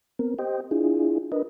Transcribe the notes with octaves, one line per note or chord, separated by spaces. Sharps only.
B3 C4 A#4
G4 C5 D#5 G5
D4 E4 F4 G#4
D4 A#4 B4 D#5